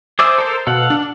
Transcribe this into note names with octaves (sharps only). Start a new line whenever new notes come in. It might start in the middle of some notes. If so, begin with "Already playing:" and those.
G#4 C5 D5 E5
A4 A#4 A5
B2 A4 F5 F#5
D4